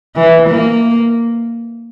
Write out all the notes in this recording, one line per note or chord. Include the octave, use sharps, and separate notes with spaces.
E3
A#3